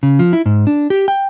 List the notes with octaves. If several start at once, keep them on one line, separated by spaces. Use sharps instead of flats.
C#3
F3
E4
G#2
D4
G4
G5